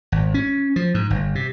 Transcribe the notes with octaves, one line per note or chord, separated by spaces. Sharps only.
G#1
C#4
F3
G#2
G1
C3